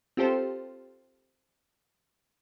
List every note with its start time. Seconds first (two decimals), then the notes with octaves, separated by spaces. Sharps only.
0.17 C4 F4 G4 A4 C5